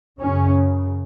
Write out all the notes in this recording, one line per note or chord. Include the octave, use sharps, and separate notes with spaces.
F#2 C#3 C#4